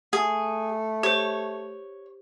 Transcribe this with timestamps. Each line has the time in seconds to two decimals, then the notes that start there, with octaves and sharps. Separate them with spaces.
0.13 A3 G#4
1.03 G4 C5 C#5